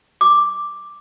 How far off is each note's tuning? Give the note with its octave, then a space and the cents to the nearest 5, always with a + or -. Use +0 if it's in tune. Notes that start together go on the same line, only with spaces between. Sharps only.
D6 +0